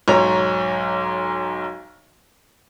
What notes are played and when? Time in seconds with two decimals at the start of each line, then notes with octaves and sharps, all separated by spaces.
0.08 B1 G#2 C#5 A#5